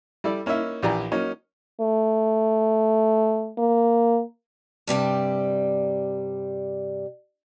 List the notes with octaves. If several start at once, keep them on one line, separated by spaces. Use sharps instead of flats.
G3 E4 A4 D5
A#3 C#4 D#4 E4 E5
A#1 E3 G4 D5 G#5 A#5
F#3 A#3 C#4 D#4
A3
A#3
G2 C3 G3 C4